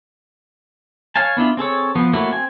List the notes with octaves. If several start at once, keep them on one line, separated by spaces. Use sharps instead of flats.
C#5 F5 G#5 A5
B3 D4 E4 F4
C4 G#4 A4 C#5
F3 B3
F#3 A3 A#3 E4 F#4
C4 G#5